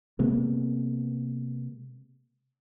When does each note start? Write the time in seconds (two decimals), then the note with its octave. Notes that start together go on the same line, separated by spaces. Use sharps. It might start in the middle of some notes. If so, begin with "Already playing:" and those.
0.19 C3 G#3 A#3 B3